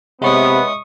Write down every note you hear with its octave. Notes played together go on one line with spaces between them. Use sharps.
C3 G#3 B3 C#4 E4 C#6 D#6